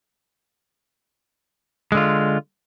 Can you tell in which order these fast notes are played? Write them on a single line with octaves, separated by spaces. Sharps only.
G#3 D3 F4